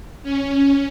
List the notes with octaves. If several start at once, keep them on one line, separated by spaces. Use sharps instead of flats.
C#4